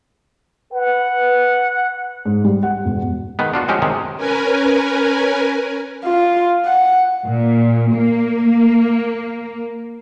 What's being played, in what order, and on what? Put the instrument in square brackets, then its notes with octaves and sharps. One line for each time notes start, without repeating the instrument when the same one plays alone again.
[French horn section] B4 [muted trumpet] F#5
[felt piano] G#2
G3
F#5
E1
[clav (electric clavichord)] D#3 G#3 B3
D4 F4 F#4
F3 G#3 C#4 F#4 G4
C3 D#3 G#3
[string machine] C#4 A#4 B4 G#5
[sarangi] F4
F#5
[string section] A#2
A#3